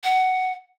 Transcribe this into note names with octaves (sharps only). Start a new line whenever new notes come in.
F#5